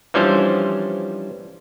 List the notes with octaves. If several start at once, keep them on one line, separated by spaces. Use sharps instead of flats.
E3 F3 G3 C#4 D4 C5